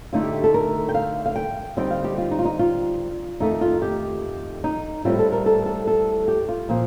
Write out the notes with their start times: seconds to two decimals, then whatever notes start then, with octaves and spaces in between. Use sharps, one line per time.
0.13 D2 D3 A3 D#4 F4
0.23 G4
0.33 G4
0.44 A4
0.54 A#4
0.89 G5
0.95 F5
1.26 F5
1.36 G5
1.77 D3 G3 C4 D#4 G5
1.91 F5
2.04 G4
2.18 F4
2.31 D#4
2.39 F4
2.45 D#4
2.59 F4
3.40 F2 D#3 A3 D#4
3.61 F4
3.82 G4
4.64 D#4
5.05 A2 G3 C4 F4
5.19 A4
5.32 A#4
5.46 A4
5.66 A4
5.87 A4
6.28 G4
6.49 F4
6.69 A#2 F3